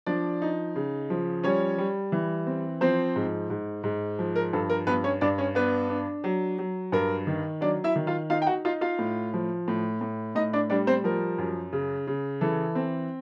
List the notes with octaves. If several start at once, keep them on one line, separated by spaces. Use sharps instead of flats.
F3 D4 D5
D#4
C#3
F3
G3 C#4 C#5
G3
E3
C4
F3 C4 C5
G#2
G#2
G#2
F3
A#4
G2 A4
A#4
G2 B3 B4
C#4 C#5
G2 D4 D5
C#4 C#5
B3 D4 B4
D4
F#3
F#3
G2 A#4
D#3
F#3 D4 D5
E4 E5
D#3
F4 F5
D#4 F4 F5
G5
F#4 F#5
D#4 F4 F5
F4 F5
A2
F3
A2
A2
A2 D#4 D#5
D4 D5
G3 D4 D5
C4 C5
F3 A#4
F#2
C#3
C#3
E3 A4
C4